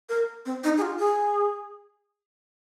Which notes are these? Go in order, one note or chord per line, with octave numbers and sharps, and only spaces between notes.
A#4
C4
D#4
G#4
F4
G#4